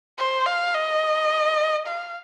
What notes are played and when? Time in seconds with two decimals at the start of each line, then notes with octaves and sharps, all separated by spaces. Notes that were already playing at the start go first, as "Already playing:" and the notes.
0.19 C5
0.46 F5
0.74 D#5
1.87 F5